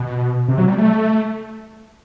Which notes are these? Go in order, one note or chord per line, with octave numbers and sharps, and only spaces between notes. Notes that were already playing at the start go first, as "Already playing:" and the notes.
Already playing: B2
C3
F#3
G3
A3